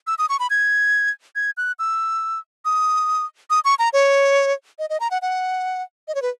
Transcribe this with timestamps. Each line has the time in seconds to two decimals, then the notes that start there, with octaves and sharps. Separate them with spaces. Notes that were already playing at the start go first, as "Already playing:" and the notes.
0.07 E6
0.19 D#6
0.29 C#6
0.40 B5
0.50 G#6
1.36 G#6
1.57 F#6
1.79 E6
2.65 D#6
3.50 D#6
3.65 C#6
3.79 A#5
3.93 C#5
4.79 D#5
4.90 D#5
5.00 A#5
5.11 F#5
5.22 F#5
6.08 D#5
6.15 C#5
6.22 B4